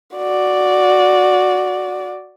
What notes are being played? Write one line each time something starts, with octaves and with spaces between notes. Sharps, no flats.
F#4 D5